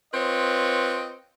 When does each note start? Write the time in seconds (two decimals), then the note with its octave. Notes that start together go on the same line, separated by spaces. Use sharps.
0.14 C4 F4 B4 C#5 D#5